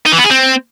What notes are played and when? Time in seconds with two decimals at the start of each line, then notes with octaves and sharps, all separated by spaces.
0.06 D#4
0.12 E3
0.18 B3
0.24 G#4
0.30 C4